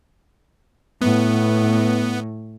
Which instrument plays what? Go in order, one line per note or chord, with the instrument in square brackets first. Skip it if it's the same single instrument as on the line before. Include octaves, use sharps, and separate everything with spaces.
[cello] A2 [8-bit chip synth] B3